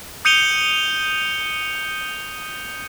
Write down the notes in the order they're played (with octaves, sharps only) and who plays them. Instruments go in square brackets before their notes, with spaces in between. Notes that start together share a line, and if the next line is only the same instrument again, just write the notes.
[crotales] D#6 G6 C#7 D#7 F7 G7